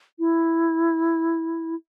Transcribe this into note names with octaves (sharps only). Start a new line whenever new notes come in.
E4